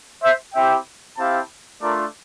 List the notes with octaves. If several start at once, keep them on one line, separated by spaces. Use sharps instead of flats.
C5 E5
C4 E4 G4 E5 G5
C4 E4 G4 F5 A5
A3 D4 F4 A#4 D5